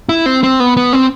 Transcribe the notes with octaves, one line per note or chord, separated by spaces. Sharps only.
E4
C4
C4
B3
B3
C4